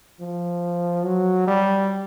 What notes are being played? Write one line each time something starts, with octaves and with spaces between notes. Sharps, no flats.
F3
F#3
G3